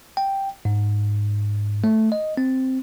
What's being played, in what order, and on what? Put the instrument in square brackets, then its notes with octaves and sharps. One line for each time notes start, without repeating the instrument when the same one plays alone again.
[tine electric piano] G5
G#2
A3
D#5
C4